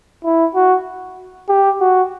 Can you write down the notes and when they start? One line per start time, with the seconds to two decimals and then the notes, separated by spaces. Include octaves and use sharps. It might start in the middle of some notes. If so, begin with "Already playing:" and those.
0.25 E4
0.55 F#4
1.49 G4
1.81 F#4